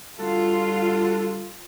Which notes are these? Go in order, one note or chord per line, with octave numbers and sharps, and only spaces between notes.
D3 G3 F4 F#4 A4